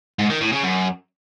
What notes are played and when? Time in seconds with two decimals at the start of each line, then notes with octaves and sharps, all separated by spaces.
0.19 G#2
0.30 D#3
0.41 A2
0.53 C#3
0.64 F#2